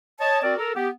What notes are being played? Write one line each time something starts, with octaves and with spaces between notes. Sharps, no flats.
C#5 D#5 A5
C4 F#4 A#4 D5
A4 A#4
B3 G4